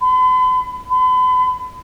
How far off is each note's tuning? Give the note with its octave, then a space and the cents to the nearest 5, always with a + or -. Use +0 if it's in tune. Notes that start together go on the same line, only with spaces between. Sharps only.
B5 +45
B5 +40